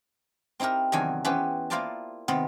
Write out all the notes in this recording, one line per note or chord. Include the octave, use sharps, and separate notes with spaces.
C4 D#4 E4 G4 A#4
E2 C3 D#3 F#3 D4 G#5
E3 B3 C#4 G4 B4 C5
A#3 E4 F4 C5 D5 A5
C3 D#3 B3 C4